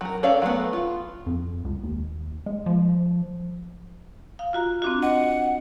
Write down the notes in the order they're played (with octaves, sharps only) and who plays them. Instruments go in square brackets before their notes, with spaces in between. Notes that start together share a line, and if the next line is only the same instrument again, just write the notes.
[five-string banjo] F#3 A#4
C#4 A4 C#5 D5 F5
F#3 A3 B3
F4
[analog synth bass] F2
C#2
D#2
G#3
F3
[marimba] F5
F4 F#4 A#5
C4 D4 F#4
[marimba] D#5 [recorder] F#5